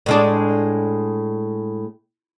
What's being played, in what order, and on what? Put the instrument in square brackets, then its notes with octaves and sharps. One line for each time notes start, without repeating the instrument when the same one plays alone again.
[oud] A2 G#3 D4